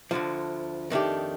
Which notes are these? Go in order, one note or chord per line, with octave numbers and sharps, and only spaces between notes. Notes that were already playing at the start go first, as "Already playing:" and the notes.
D2 D3 F3
F2 D#3 A3 D4 G4